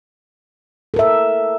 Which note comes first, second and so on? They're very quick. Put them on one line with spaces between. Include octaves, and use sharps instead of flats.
A4 A#4 E5